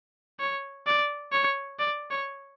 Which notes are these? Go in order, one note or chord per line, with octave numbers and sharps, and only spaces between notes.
C#5
D5
C#5
D5
C#5